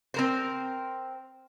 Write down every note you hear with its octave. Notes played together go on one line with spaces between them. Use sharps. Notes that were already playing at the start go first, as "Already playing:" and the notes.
C4 A#4 C5